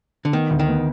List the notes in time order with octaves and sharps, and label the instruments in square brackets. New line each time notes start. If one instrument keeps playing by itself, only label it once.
[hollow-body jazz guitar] D3
[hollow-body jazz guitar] D#3 [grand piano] B3
[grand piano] D2
[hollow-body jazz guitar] D#3
[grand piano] B3